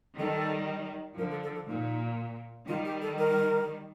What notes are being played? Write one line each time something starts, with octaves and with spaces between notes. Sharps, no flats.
D#3 G3 A4
D3 F3 A#4
A4
A4
A4
A#2 D#4
D#3 G3 F4
G4
A4
A#4